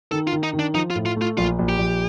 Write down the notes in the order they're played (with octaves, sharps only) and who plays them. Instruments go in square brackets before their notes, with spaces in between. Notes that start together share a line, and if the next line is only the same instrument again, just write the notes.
[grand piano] D#3 [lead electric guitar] A4
[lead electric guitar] F4
[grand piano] D#3
[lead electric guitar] D#4
[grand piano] D#3
[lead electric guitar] D4
[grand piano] F3 [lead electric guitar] D#4
[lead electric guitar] F4
[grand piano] A2
[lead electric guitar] F4
[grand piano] A3 [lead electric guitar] F4
[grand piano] A#1 [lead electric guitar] F4
[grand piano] A#1
[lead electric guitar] G4
[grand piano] A#1